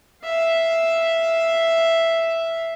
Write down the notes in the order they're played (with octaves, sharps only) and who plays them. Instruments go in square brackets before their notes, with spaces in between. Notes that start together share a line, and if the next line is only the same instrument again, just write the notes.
[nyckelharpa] E5 F5